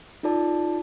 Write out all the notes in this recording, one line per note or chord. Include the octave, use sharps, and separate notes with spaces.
D#4 F4 A4 D5 A5